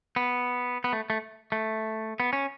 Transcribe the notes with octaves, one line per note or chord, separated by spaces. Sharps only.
B3
B3
A3
A3
A3
B3
C#4